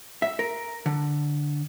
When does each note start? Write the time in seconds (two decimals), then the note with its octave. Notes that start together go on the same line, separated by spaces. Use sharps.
0.22 E5
0.39 A#4
0.86 D3